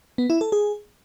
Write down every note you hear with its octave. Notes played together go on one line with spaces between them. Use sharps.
B3
E4
A4
G#4